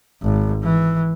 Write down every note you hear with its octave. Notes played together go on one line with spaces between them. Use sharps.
G#1
E3